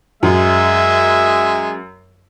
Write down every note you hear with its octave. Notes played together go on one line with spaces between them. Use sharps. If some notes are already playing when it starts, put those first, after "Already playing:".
F#2 G#3 E5